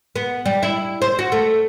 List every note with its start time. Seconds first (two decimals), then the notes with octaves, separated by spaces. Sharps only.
0.15 B3
0.46 G3
0.63 E4
1.02 C5
1.19 F#4
1.32 A3